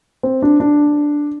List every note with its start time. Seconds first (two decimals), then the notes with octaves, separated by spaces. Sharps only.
0.23 C4
0.42 D4
0.60 D4